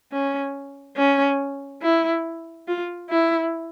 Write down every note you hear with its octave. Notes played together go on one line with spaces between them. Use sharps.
C#4
C#4
E4
F4
E4